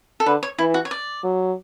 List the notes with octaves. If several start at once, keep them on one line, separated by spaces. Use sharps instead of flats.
A4
D3 B4
C#5
E3 E4
F#4
C#5
D5
F#3